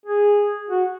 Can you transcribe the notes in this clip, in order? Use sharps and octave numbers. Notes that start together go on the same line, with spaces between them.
G#4
F#4